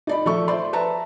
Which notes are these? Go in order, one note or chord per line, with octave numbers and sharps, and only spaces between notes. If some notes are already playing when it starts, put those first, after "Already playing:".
D#4 D5 B5
F3 A4 E5 C#6
C5 D5 E5 C6
B4 E5 A5 A#5